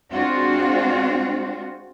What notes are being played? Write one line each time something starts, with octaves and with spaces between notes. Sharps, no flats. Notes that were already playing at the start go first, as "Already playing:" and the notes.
G#3 C4 D4 F4 F#4